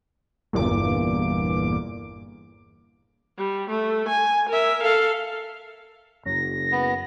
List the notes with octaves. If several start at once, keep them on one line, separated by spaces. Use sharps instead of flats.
G1 E2 A#2 D6
G3
A3
G#5
A#4 E5
A4 F5
F#1 F#2 A#6
B3